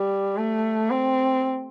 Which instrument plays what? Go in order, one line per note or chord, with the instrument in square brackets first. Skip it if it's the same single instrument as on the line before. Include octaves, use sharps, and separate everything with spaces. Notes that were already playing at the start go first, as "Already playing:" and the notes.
Already playing: [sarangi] G3
A3
C4